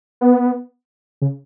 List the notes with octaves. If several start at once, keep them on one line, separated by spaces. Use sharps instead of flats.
B3
C#3